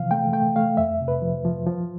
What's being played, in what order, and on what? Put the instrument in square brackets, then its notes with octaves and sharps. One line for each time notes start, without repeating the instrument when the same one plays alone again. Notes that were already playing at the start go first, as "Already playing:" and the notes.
Already playing: [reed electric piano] C3 E3 F3 F5
A3 G5
A3 G5
A3 F5
F2 E5
C3
B4
F3
F3
F3